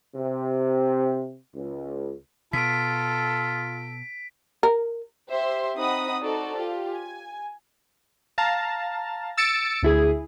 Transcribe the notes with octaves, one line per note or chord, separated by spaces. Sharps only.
C3
C#2
B2 F4 A4 B6 D7
A#4
G4 C5 E5 C6
C4 D#4 F#5 B5 D#6
D#4 F#4 A4 C5 D5
F4 G4
G#5
F5 A5 A#5
E6 A6 C#7 D7
D2 E4 G#4